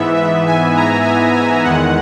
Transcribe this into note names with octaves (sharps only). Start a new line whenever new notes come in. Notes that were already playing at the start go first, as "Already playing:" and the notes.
Already playing: G#2 E3 B3 E5
E5
G#5
A#5
G#5
G#5
E2 D#3 G#3 F#5